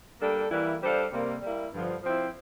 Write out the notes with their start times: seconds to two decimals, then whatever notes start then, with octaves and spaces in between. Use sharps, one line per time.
0.20 G3 A#3 D4 A4
0.50 E3 G3 A#3 E4
0.82 G3 D4 A4 C5 F5
1.12 C3 G3 A#3
1.42 G3 A#3 E4
1.72 G2 D3 F3
2.02 F3 C4 E4